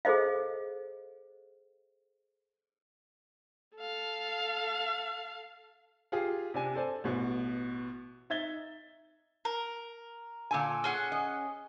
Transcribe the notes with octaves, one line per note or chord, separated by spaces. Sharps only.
G#4 A4 C5 D#5 F5
A4 F5
F4 G4 G#4 F5
C3 D4 G#5
A4 C5 D5 G#5
A1 B2
D#4 E5 G#6 A6 G7
A#4
A#2 D3 G#5
C#4 G#4 F#5
D#5